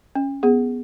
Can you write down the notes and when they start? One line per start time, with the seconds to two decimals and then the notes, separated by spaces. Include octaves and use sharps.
0.15 C#4
0.43 B3 G#4